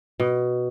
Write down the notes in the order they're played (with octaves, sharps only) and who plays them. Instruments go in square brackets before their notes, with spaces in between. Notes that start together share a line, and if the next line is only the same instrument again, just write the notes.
[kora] B2